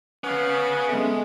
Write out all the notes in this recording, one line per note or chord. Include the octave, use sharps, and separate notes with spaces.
B3 C#4 F5
G#3 A3 B3